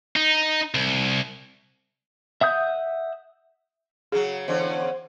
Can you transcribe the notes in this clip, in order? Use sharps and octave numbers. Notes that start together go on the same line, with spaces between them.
D#4
C2
E5 F#5 D#6 G6
C#3 F#3 G#4
E2 D3 C#4 C5